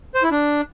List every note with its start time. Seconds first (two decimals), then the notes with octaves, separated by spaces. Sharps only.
0.15 C5
0.23 E4
0.31 D4